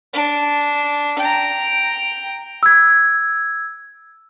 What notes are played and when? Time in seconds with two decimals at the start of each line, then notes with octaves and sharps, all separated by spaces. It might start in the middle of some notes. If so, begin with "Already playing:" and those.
0.14 D4
1.19 G5 A#5
2.63 E6 G#6